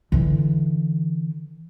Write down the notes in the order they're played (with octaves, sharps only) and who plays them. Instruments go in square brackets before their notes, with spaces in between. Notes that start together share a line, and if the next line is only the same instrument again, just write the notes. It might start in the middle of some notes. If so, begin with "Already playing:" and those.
[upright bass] D3 E3